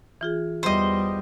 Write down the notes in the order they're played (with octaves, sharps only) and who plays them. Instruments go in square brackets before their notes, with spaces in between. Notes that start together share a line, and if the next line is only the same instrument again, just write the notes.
[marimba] E3 F4 G#4
[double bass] E2 G3 [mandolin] C5 D#5